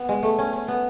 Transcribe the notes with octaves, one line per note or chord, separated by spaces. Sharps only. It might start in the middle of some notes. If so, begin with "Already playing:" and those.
Already playing: B3
G#3
A3
C#4
C#4
B3